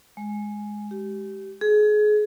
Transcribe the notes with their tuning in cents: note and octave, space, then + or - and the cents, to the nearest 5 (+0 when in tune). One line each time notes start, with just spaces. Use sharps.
G#3 +5
G4 -20
G#4 +30